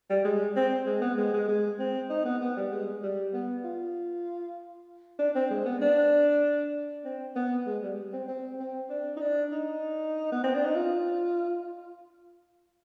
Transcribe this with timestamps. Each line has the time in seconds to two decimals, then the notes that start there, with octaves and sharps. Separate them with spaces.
0.10 G3
0.24 G#3
0.56 C4
0.86 G#3
1.02 B3
1.18 G#3
1.33 G#3
1.48 G#3
1.79 C4
2.10 D#4
2.25 B3
2.41 B3
2.56 G3
2.71 G#3
3.03 G3
3.33 B3
3.64 F4
5.19 D4
5.35 C4
5.50 G#3
5.66 B3
5.82 D4
7.05 C4
7.35 B3
7.66 G#3
7.82 G3
8.13 C4
8.28 C4
8.59 C4
8.90 D4
9.16 D#4
9.21 D4
9.52 D#4
10.32 B3
10.43 C4
10.54 D4
10.65 D#4
10.75 F4